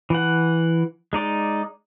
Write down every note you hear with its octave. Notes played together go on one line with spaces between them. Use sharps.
E3 F#5
G#3 D#4 D5